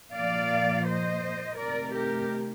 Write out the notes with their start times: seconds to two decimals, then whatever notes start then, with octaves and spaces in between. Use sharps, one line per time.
0.14 A#2 F3 A#3 D5 F5
0.86 C5 D#5
1.58 C3 D#3 A3 A#4 D5
1.95 G4 A#4